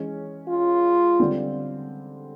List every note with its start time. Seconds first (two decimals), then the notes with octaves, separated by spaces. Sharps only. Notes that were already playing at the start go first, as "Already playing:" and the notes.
Already playing: E3 G#3 C#4
0.49 F4
1.20 D3 G3 C4